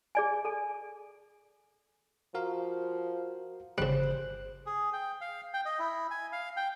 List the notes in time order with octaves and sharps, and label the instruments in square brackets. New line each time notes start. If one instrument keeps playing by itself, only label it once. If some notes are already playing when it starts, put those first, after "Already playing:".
[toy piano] G#4 D5 G#5
A4 G#5
[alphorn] F3 [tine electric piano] F#4 A#4 F5
[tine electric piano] G1 F#6 [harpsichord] C#3 G3 [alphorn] C5
[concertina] G#4
G5
F5
G5
D#5
E4
G#5
F5
G5